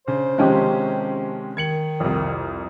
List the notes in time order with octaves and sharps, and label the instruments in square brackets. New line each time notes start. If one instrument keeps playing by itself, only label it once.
[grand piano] C#3 [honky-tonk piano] D4 [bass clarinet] C5
[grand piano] C3 D#3 G#3 [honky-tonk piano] F3 C#4 G4
[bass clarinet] D#3 [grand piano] G#6 C#7 F#7
[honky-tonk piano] C2 F2